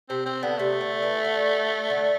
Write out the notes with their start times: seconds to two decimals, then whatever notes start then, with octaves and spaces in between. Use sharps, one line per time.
0.09 C3 C4
0.26 C3 C4
0.43 D3 B3
0.58 C3 A3
0.81 D3
1.03 E3
1.25 D3
1.90 D3